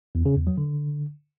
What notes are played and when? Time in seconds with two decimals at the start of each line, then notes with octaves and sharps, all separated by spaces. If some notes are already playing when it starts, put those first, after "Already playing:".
0.15 E2
0.26 C#3
0.36 E2
0.47 F#3
0.58 D3